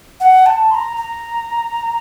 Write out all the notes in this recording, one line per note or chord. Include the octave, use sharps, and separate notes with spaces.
F#5
A5
C6
A#5
A#5